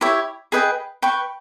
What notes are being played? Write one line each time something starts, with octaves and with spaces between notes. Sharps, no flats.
E4 G4 C#5 E5
G#4 B4 D#5 G5
B4 G5 C#6